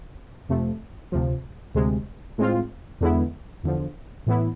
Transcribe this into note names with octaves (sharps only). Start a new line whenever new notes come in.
F2 C3 F3 A3
D2 C3 F3
D2 C3 G#3
A2 G#3 C4 F4
E2 D3 G#3 B3 E4
E2 D3 F3
A2 E3 B3 E4